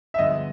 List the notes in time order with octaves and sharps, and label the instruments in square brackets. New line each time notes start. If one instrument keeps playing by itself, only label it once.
[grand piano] E5
[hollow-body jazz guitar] G2 D3 F3 G#3 B3 [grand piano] D#5